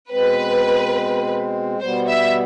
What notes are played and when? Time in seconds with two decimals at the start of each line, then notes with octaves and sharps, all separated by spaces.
0.11 B2 G#3 C4 B4
1.80 B2 G3 B3 C5
2.07 E5